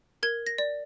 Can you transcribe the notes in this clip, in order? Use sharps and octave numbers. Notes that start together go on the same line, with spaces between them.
A#4 G#6
A#6
D5